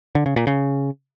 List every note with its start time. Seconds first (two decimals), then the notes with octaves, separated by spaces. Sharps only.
0.15 D3
0.26 C#3
0.36 A#2
0.47 C#3